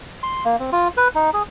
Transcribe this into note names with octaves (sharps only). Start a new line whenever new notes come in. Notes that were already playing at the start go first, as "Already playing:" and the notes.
C6
A#3
C4
F4
B4
D#4
G#4